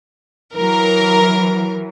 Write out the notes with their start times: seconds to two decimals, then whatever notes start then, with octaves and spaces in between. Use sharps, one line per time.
0.54 E3 F#3 A#4